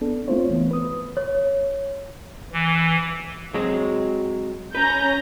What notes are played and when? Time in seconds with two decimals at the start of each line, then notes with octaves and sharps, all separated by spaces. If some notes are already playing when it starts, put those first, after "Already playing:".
0.01 B3 D4 A4
0.28 A3 C4 E4 F4 C5 C#5
0.49 C#2 E3 B3
0.71 B4 D#6
1.17 C#5
2.52 E3
3.54 F#3 G#3 C4
4.75 C#4 B4 A#5 G6